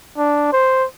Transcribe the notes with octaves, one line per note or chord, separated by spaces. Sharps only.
D4
C5